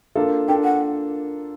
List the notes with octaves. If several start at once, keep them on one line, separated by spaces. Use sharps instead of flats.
A#3 D4 F4 A4
A#3 D4 F4 A4 G5
F#5